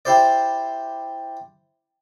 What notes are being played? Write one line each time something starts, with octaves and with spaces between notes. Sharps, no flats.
E4 G4 C5 D5